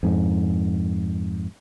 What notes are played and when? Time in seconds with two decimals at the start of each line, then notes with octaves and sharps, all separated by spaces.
0.03 F2 G#2